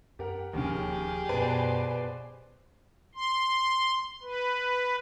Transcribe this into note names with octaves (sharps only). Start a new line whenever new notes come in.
F#2 G4 A#4 F#5
D1 D#2 C#3 F3 C#4 G4 G#4
F#2 B2 B4 C5 D5 G#5 A5
C6
B4